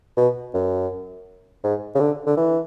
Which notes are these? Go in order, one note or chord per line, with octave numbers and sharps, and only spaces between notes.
B2
F#2
G#2
C#3
D3
D3
E3